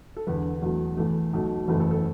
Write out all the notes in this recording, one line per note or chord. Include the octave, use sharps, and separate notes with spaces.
A4
E1 E2 D3 B4
E2 B2 F#3 A3
E2 E3 A3 A4
B1 B2 A3
F#1 E2 E3 A3
A4
A4